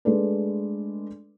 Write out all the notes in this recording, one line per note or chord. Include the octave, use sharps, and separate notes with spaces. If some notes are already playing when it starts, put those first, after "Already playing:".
G#3 A3 D4 A4 B4 D5